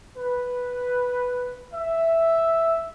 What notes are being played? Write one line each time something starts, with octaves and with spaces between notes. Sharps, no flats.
B4
E5